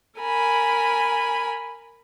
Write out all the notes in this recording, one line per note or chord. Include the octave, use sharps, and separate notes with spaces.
A#4 G#5 B5